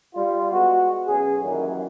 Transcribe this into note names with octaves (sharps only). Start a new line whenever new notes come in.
G3 F4
G#3 B3 F#4
B1 C#4 G#4
F#2 D#3 E3 G3 A#3